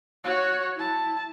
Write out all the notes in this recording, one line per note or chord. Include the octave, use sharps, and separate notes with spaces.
F#4 C#5
E4 A5